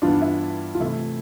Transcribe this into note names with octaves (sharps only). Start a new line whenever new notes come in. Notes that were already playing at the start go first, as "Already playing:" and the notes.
G2 E3 B3 D4 F4
E4
F4
C3 E3 A3 E4